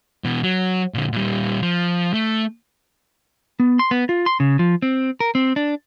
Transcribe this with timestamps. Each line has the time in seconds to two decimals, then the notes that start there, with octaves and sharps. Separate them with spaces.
0.24 B2 E3
0.43 F#3
0.94 A#2 D3
1.13 A#2 G3
1.62 F3
2.14 A3
3.60 B3
3.79 C6
3.91 B3
4.09 F4
4.26 C6
4.40 C#3
4.59 F3
4.82 C4
5.20 A#4
5.35 C4
5.56 D4